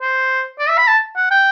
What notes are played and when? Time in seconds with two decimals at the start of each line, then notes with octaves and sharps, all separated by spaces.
0.01 C5
0.59 D5
0.69 E5
0.78 B5
0.88 A5
1.17 F#5
1.31 G5